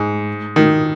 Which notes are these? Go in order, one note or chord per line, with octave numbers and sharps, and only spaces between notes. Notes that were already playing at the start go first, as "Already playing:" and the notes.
Already playing: G#2
D#3